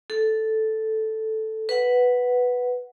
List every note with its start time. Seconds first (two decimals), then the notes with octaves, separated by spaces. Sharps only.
0.10 A4
1.69 B4 F#5